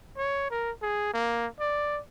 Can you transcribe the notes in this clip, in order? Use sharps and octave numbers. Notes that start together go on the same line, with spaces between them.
C#5
A#4
G#4
A#3
D5